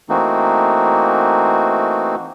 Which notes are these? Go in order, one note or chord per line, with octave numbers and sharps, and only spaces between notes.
E3 A3 A#3 C4 D#4 F#4